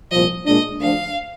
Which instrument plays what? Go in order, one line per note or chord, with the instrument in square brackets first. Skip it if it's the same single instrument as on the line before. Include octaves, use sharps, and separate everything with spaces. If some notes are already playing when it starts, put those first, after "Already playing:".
[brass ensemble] C2 A#2 F3 [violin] D#5
[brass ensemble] A#2 G#3 D4 [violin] D#5
[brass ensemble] D2 D3 F3 [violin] F5